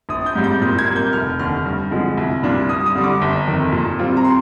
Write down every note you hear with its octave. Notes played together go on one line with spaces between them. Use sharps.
A#1 D#6
G6
G#2 G3
G6
A#2 G6
G#6
G3 A#3
G6
F1 F6
D#2 D3 F6
G2
D3 F3 G#3
C2
A#2 G3 D4 F4
G2 D#6
D#6
D3 G3
D6
G1
F2 D#3
A#2
G3 C4 F4
A#5
C6